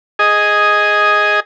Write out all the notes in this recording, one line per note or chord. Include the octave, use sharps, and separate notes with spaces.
G#4 D#5